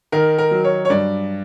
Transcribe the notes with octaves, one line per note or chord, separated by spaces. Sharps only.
D#3 A#4
A#4
F#3
C#5
C#5
G2 D5